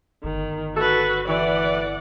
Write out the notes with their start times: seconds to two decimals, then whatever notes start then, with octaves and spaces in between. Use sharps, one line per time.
0.24 G1 D#3
0.76 F#4 A4 B4
1.28 E3 D5 F#5